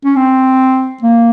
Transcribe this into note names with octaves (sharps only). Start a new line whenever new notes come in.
C#4
C4
A#3